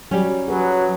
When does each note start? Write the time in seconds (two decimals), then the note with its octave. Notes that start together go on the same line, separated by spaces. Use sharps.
0.11 F#3 G3 C#4
0.48 F#3 G#4 B4